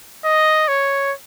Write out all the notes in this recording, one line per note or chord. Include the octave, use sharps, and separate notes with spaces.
D#5
C#5